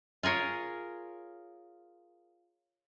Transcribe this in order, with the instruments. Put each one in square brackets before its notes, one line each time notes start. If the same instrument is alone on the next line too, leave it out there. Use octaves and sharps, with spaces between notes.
[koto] F4 G#4 A#4 C#5